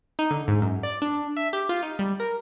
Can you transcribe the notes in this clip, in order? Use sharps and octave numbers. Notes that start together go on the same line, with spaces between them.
D#4
D3
G#2
F#2
D5
D4
E5
G4
F4
D#4
G3
A#4